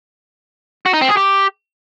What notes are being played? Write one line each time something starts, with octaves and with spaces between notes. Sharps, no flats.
F#4
D#4
C4
G#4
G4